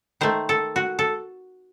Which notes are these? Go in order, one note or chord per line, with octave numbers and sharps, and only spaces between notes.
D#3 A3 C5
A4
F#4
A4